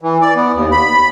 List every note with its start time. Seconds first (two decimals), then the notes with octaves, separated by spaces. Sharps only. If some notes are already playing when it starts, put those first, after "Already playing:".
0.02 E3
0.21 D5
0.36 B3
0.54 D#2
0.72 B5